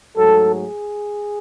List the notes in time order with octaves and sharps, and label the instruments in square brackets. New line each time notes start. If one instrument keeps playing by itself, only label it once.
[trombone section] G#2 F#3 A3 A4
G#4